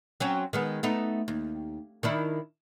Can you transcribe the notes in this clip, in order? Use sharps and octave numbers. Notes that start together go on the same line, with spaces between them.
F#3 C4 C#4
D#3 G#3 B3
A3 B3 D#4
D#2
D#3 D4 E4